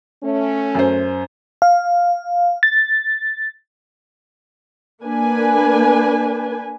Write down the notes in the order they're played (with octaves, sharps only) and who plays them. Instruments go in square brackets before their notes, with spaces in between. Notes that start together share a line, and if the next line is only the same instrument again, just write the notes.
[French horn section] A3 C#4
[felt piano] F#2 C5
[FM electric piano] F5
A6
[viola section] A#3 D4 B4 G#5